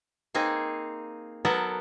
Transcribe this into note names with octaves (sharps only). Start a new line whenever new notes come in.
A#3 C4 D#4 G#4
F#3 B3 A4 A#4 F#5